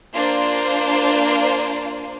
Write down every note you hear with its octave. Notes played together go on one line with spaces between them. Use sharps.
A#3 D4 F4 C5 D5 C7